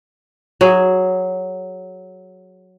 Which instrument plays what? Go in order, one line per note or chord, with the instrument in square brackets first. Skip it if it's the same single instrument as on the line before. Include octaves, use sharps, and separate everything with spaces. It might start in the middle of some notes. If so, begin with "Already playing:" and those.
[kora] F#3 G#4